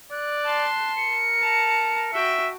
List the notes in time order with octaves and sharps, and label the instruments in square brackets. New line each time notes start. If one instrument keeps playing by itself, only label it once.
[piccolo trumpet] D5 [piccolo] F#6
[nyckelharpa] A5 C6
[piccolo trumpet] A#4 [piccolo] C#7
[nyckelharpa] A5 A#5
[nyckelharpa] F#4 G5 [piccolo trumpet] E5